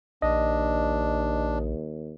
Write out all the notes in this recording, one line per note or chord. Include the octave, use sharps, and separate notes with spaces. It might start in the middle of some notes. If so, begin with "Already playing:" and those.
A#1 D#2 D4 D#5